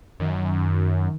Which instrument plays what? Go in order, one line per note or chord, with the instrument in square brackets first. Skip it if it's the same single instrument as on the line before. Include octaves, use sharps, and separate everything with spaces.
[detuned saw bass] F#2 [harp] D#3